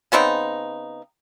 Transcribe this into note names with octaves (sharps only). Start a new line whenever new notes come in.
C#3 B3 C4 D#4